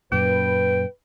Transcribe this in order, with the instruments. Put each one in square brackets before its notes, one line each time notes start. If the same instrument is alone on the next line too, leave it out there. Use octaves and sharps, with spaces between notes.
[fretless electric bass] F#2 A#2 [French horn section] B4 [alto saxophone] G5